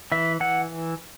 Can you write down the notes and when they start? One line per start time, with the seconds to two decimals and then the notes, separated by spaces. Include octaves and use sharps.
0.12 E3 E5
0.40 E3 F#5